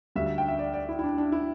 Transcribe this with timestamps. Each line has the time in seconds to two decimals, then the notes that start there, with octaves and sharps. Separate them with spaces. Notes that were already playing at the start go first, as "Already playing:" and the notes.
0.15 D2 D3 G3 E5
0.26 E5
0.38 G5
0.48 E5
0.59 D5
0.73 D5
0.89 E4
0.99 E4
1.04 D4
1.18 D4
1.32 E4